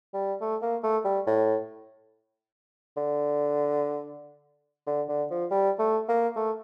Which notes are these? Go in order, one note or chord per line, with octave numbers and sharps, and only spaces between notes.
G3
A3
A#3
A3
G3
A2
D3
D3
D3
F3
G3
A3
A#3
A3